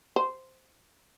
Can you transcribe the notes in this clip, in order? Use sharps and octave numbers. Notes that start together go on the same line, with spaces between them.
C5